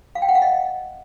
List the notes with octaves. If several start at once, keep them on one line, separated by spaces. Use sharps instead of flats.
F5
G5
F#5
F5
D#5